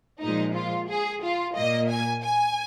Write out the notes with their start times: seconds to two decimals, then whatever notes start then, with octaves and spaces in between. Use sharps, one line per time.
0.21 A#2 F3 G#3 D#4
0.54 F4
0.89 G#4
1.22 F4
1.55 A#2 A#3 D#5
1.89 G#5
2.23 G#5